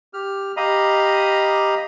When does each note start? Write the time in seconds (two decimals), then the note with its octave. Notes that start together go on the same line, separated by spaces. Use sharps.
0.14 G4 F6
0.57 G4 D#5 F5 A#5 B5 D#6